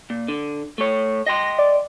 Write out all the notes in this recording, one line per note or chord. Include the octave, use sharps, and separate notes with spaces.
A#2
D3
A3 C#5
D#5 G5 C6 A#6
D5